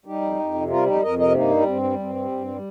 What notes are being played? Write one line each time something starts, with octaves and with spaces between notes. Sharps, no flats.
G3 D#4 G4
F2
F2
C3
G3 F4 A#4
F2 D#4 G4
F2 A#4 D#5
C3 A#4 D#5
G2 A#3 D#4
G3
G2 C4
G3
G2 C4
G3
G2
G3